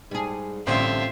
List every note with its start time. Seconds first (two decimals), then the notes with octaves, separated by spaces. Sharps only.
0.11 G#2 G3 G#4
0.67 A1 D3 G3 C4 F4 E5